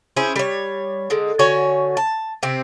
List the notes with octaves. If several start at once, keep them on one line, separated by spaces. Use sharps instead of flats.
C#4 E4 G#4 C5
G3 C#5
D3 G#3
D3 F#4 C#5 G#5
A5
C3 C4